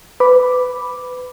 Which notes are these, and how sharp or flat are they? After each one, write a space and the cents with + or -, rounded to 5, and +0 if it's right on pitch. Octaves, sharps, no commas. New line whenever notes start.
B4 +25 B5 +0 D6 +0